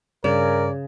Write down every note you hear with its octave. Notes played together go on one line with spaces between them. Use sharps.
G2 C#3 A#4 D5